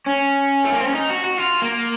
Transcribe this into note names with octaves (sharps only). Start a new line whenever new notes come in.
C#4
A3
A#3
C4
C#4
D#4
F#4
F#4
F4
A#3